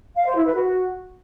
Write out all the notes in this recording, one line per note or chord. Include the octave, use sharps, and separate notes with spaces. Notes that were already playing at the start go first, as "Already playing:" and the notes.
F5
C5
E4
B4
F#4